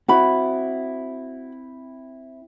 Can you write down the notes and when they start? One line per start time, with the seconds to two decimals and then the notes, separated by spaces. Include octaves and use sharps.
0.08 C4 E4 F#4 B5